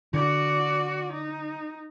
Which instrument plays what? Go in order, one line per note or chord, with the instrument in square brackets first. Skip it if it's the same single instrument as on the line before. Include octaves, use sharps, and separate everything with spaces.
[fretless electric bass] D3 [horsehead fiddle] F#4 D5
[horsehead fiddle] D#4